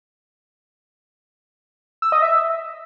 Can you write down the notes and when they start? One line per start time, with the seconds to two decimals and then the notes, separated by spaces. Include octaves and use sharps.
2.02 E6
2.12 D#5
2.22 E5